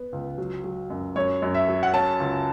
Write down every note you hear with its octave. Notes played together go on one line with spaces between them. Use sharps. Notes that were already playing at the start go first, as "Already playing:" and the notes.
Already playing: B3
C#2
F#3
F#3
F#2
F#2 C#5
F#2
E5
F#3
F#5
C#4 A5
C#2